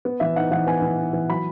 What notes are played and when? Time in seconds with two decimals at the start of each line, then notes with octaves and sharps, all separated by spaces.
0.05 B3
0.20 E3 E5
0.36 D#4 F#5
0.51 E3 F#5
0.67 B3 G#5
0.82 E3
0.99 D#4
1.13 E3
1.29 F#3 B5